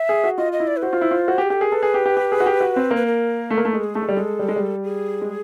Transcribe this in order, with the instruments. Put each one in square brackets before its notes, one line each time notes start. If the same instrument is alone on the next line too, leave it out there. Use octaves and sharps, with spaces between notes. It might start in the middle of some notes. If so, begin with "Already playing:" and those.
Already playing: [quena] E5
[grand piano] G#4
F#4
[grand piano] F4 [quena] D#5
[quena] D#5
[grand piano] E4
[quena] D5
B4
[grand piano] F#4 [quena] C5
[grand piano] F4
E4
F4
F#4
G4
[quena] G#4
[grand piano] G4 [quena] A4
[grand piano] G#4 [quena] A#4
[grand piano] A4 [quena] B4
[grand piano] G#4
G4
G4
G4
G#4
F#4
G4
F#4
C4
A#3
[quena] B4
A#4
[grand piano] A3
A#3
A3
G#3
[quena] G#4
[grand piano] A3 [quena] A4
[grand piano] G#3
G3
G#3
G3
G#3
G3
[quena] G#4
[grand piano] G#3